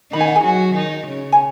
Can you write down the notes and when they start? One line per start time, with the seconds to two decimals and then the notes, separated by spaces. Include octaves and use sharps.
0.12 D#3 D#4 B5
0.21 G#5
0.28 F#5
0.35 G#4 G#5
0.44 F#3 F#4
0.75 D#3 D#4
1.07 C#3 C#4
1.32 G#5